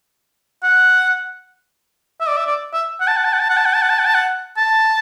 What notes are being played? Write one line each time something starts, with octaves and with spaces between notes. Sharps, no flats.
F#5
E5
D5
E5
D5
E5
F#5
A5
F#5
A5
F#5
A5
F#5
A5
F#5
A5
F#5
A5
F#5
A5
F#5
A5